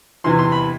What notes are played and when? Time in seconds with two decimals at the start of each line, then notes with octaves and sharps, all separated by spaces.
0.24 E2 C3 E3 C6
0.39 C6
0.52 B5